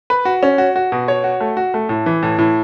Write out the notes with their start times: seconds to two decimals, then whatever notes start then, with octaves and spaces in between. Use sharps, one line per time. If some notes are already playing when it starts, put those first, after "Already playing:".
0.10 B4
0.25 F#4
0.43 C#4
0.58 F#4
0.76 F#4
0.92 B2
1.08 C#5
1.24 F#4
1.40 A3
1.57 F#4
1.74 A3
1.89 A2
2.06 E3
2.23 A2
2.38 A2